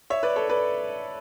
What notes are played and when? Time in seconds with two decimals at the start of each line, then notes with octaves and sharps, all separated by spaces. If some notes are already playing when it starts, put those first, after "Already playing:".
0.10 C#5 E5
0.23 B4 D5
0.36 A4 C#5
0.50 B4 D5